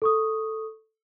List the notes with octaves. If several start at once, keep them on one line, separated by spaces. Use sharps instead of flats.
A4 C#6 D#6